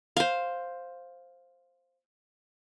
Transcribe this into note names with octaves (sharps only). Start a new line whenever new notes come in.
C5 F5